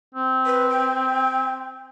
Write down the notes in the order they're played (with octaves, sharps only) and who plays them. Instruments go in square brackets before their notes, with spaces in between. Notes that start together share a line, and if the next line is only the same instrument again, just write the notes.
[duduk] C4
[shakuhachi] B4
G5